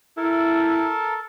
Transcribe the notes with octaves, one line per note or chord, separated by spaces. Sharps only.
E4 A4 A#4 A5